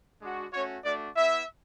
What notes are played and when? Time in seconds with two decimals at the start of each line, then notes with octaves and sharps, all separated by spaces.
0.21 G#3 D4 F#4
0.52 A3 C#4 F#4 C#5
0.84 A3 D4 F#4 D5
1.15 B3 E4 E5